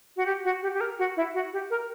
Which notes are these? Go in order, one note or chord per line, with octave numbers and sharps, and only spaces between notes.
F#4
G4
F#4
G4
G4
A#4
F#4
E4
F#4
G4
A#4